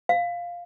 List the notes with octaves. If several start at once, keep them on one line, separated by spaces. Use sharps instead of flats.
F5